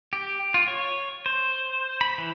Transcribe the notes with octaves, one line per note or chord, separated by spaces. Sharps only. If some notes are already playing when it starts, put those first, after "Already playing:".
G4
F4
C#5
C5
B5
E3